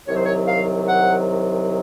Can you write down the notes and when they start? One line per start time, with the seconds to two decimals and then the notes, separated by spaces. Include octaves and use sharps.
0.07 C2 C3 D#3 F#3 C#5
0.16 C5
0.25 C#5
0.48 F5
0.88 F#5